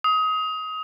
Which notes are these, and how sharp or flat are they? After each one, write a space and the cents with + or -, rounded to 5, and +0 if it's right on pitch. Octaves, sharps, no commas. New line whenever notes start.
D#6 +25